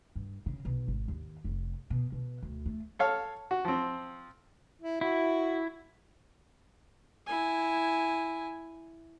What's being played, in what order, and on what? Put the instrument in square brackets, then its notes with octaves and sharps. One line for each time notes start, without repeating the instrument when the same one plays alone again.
[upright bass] G2
C#3
B1
G#1
D#2
F1
B2
B2
D2
A3
[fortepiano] A4 C#5 F5
F#4
F3 C4
[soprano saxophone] E4
[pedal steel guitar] E4 [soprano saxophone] F#4
[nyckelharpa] E4 G#5